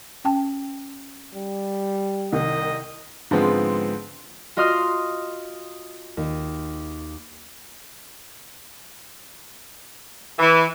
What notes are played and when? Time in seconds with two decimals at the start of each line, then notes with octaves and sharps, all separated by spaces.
0.25 C#4 G5 A5
1.34 G3
2.32 C2 D#3 D#5
3.31 G#2 D3 F3 G#3 B3 C4
4.57 F4 F#4 D#5 C6 D#6 F6
6.17 D#2
10.39 E3